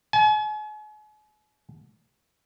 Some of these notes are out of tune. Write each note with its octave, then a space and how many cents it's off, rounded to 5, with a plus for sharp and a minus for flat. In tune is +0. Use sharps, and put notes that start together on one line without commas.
G#5 +40